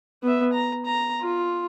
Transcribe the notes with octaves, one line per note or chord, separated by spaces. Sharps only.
B3 E5
A#5
A#5
F4